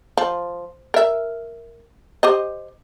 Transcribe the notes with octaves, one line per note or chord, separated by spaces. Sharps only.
F3
A#4 E5
G4 C5 D#5